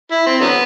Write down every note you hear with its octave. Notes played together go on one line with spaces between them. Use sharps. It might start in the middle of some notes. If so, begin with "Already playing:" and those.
E4
C4
D3 F#3 B3